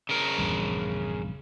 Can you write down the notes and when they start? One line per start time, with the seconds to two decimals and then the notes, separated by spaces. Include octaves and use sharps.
0.09 C#3 A#4
0.38 A#1 E2 G2